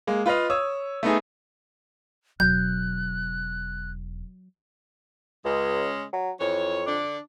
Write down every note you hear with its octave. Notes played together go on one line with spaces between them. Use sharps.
G#3 A#3
F4 B4 D#5 F5
C#5 D#6 E6
A3 B3 D#4 G#4
E1 F#3 F#6 G6
C#2 C#3 G#3 C#4
F#3
F2 E3 C#5
D3 D4